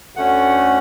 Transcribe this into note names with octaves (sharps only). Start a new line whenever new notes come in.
D2 D3 A3 C#4 F#5